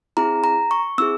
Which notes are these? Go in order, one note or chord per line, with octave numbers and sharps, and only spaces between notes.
C4 E4 G#4 A#5
A#5
C#6
C4 E4 G#4 E6